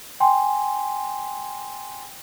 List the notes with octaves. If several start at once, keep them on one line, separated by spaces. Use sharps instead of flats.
G5 G#5 C6